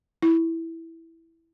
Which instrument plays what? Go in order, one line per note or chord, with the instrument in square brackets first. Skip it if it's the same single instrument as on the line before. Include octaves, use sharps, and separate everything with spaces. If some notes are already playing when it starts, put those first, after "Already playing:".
[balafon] E4